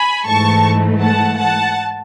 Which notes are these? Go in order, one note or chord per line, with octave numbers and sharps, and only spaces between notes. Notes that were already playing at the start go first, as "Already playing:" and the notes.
Already playing: G#5 B5
G#2 E3 A3 A5 C#6
F#5 A5
F#5 A5